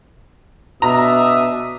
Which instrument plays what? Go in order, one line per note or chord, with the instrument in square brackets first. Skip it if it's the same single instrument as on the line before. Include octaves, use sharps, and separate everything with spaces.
[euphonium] B2 [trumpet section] D4 E5 D#6 [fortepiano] A#5